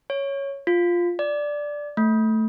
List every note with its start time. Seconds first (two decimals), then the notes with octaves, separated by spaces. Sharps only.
0.10 C#5
0.67 F4
1.19 D5
1.97 A3